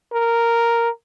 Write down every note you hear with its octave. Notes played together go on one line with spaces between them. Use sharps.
A#4